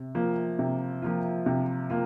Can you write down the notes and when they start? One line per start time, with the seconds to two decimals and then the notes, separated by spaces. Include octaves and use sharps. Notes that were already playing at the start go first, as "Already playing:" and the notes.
Already playing: C3
0.15 F3 A#3 F4
0.59 C3
1.02 F3 A#3 F4
1.46 C3
1.90 A#3 F4